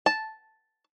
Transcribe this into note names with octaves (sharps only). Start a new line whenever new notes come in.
A5